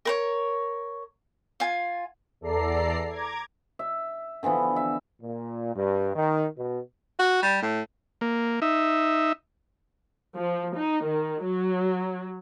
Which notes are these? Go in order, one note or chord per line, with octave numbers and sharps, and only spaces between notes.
A#4 B4 C#5
F4 G#5
E2 A4 D5 A#5 C7
A#5 D6 G#6
E5
D3 E3 F3 B3
E5
A#2
G2
D#3
B2
F#4
G3
A2
A#3
D#4 E5
F3
D#4
D#3
F#3